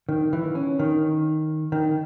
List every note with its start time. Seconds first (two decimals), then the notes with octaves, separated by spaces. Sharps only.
0.09 D#3
0.33 E3
0.55 C#4
0.79 D#3
1.72 D#3